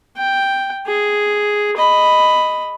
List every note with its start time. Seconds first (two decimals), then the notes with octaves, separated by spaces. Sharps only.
0.17 G5
0.86 G#4
1.77 D#5 B5